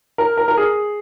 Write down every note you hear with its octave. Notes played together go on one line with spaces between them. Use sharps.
A#4
A#4
A#4
G#4